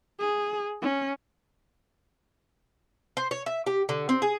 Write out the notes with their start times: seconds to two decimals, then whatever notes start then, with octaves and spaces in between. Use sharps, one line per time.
0.19 G#4
0.82 C#4
3.17 C5
3.31 C#5
3.46 E5
3.66 G4
3.89 D3
4.09 C4
4.22 G#4